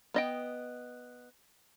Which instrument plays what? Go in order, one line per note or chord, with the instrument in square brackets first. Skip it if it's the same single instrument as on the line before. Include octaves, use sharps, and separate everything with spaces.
[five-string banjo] B3 D#5 G5